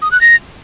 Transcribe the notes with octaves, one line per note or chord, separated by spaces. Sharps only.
D#6
F#6
A#6